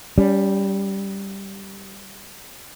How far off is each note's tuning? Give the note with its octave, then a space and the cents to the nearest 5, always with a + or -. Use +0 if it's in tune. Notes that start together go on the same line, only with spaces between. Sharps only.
G3 +0 C#4 +35